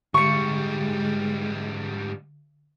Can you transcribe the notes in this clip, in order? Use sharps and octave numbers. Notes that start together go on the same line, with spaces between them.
G#2 D3 G3 G#3 C#6 C#7